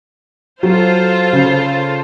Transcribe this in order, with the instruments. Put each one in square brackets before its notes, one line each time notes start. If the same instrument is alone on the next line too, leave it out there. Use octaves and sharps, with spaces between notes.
[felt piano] F#3 [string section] F4 A4 C5
[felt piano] C#3